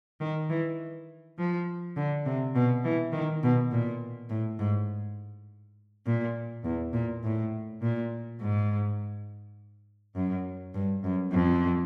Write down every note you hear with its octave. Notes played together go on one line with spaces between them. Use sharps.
D#3
E3
F3
D3
C3
B2
E3
D#3
B2
A#2
A2
G#2
A#2
E2
A#2
A2
A#2
G#2
F#2
G2
F#2
F2